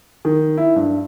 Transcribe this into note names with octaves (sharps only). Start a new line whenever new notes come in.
D#3
E4
G2